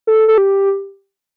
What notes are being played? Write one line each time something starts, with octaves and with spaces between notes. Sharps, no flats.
A4
A4
G4